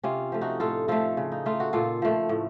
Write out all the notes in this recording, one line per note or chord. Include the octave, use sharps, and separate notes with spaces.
C3 C#4 F4
F3 A3
D#4 F#4
A2 F4 A4
F3 A3 F4 A4
C#3
D#4
A3 F4
F#4
A#2 F4 A4
F3 A3
A2